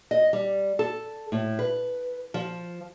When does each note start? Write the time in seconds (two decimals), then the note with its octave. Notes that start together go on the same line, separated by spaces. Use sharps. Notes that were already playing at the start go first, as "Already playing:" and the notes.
0.11 D#5
0.33 G3
0.79 A4
1.32 A2
1.59 B4
2.34 F3